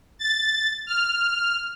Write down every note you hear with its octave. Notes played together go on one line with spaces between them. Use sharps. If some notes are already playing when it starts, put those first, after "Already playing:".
A6
F6